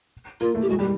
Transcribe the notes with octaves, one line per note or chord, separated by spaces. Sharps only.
A#3 F4
A3
G4
G#3 F#4
G3 G4